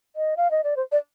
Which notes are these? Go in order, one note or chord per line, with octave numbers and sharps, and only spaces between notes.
D#5
F5
D#5
D5
C5
D5